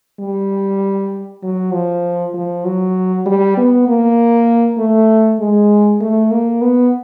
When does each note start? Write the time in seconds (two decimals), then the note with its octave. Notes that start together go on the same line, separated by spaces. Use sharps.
0.20 G3
1.43 F#3
1.73 F3
2.34 F3
2.65 F#3
3.26 G3
3.57 B3
3.88 A#3
4.78 A3
5.40 G#3
6.01 A3
6.31 A#3
6.62 B3